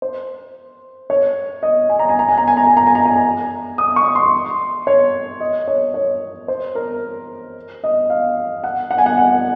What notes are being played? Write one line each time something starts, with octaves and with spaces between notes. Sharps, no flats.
C5
C#5
D#5
G#5
A#5
G#5
A#5
G#5
A#5
G#5
A#5
G#5
A#5
G#5
A#5
G#5
D#6
C#6
C6
C#5
D#5
C#5
C#5
C5
A#4
D#5
F5
F#5
F#5
G#5
F#5
F#5